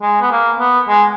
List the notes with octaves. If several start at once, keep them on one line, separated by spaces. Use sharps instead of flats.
G#3
B3
A#3
B3
G#3